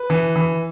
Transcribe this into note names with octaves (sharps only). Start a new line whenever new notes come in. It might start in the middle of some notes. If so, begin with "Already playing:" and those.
Already playing: B4
E3
E3